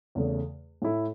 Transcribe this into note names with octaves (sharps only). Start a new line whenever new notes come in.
E2 C#3 A3
A2 A3 E4